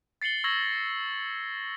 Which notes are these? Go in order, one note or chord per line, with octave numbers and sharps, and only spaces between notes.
A6 C7 C#7 F#7 G7
C#6 E6 G#6 A#6 F#7